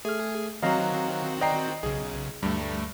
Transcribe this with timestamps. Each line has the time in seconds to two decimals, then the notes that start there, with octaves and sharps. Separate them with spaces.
0.05 A3 G#4 F6
0.62 D#3 F#3 C4 F#4 D#5 F5 A#5
1.41 D5 D#5 G5 A#5 C7
1.83 B1 C#3 G#4
2.43 D2 G2 G3 A3